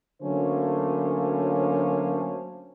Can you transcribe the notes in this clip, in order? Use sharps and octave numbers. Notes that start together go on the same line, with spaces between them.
D3 F#3 A3 A#3 C#4 C5